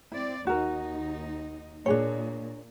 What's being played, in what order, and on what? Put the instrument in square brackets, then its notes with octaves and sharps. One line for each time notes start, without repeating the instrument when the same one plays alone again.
[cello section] C4 D5 [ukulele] E4
[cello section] D#2 D#4 [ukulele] F#4 A#4
[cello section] A#2 [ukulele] D4 G#4 C#5